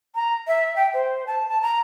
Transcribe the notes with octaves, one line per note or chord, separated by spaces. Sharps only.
A#5
E5
G5
C5
A5
A5
A#5